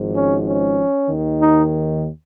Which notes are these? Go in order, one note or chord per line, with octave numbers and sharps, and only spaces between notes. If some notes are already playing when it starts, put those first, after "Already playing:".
Already playing: G#1 G#2 F3
C#4
C#4
D#2 D#3
D#4